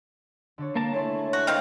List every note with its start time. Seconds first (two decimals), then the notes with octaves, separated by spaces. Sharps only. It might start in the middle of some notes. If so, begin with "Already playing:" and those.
0.58 D3 D4 C#5
0.76 A#3 A#4 A5
0.94 A3 E4 C#5 G#5 A5 C6
1.33 F#4
1.47 D#3 C4 F5